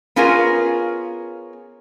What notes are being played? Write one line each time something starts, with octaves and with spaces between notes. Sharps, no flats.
B3 C#4 F4 G#4 A#4 F5